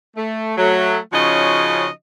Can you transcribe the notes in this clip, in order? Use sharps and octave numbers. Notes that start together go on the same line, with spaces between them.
A3
F#3 A3
C#3 F3 C#4 D#4 F#4 D#5